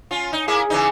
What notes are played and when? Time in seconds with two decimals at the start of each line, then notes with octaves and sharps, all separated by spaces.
0.11 C#4 F4
0.33 D#4
0.48 A#3 E4 G#4
0.70 C#3 E3 D#4